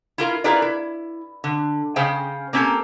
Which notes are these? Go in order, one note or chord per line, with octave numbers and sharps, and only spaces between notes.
E4 F4 A#4
E4 F4 G#4 A#4 B4 D5
E4
D3
C#3 C#4 G#4 C5 F5 G5
A#3 C4 C#4 G4 A4 A#4